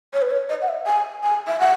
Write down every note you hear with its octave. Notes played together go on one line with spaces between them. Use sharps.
C#5
B4
C#5
D#5
F#5
E5
G#5
G#5
E5
F#5